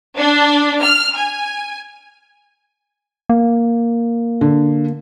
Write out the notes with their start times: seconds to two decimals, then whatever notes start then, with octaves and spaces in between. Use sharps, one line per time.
0.17 D4
0.82 F6
1.17 G#5
3.29 A#3
4.41 D3